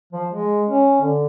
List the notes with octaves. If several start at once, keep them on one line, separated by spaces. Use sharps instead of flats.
F3
G#3
C#4
D3